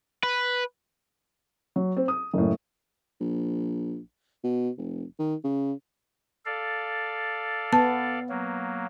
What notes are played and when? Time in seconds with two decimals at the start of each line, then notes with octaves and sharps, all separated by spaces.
0.23 B4
1.76 F#3
1.97 C4
2.08 D#6
2.34 F#1 A2
3.20 A#1
4.44 B2
4.78 F1
5.19 D#3
5.44 C#3
6.46 A4 D5 F5
7.73 B3 A5
8.29 F#3 A#3